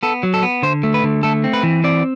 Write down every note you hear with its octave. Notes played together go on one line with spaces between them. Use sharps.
B3 A4
F#3
A4
B3
D3 C5
A3
B4
D3
A3 A4
C4
B4
E3
C4 D5